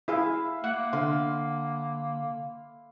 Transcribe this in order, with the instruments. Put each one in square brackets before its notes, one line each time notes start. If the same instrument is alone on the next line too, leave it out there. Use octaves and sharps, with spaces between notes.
[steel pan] E4 G#4 [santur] E5 F5 B5
[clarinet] A#3 [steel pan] F#5
[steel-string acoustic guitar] D3 [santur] F5 C6